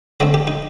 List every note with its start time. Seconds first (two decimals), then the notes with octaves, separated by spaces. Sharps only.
0.20 D3 A3 C4 D#5
0.34 G4
0.47 D#4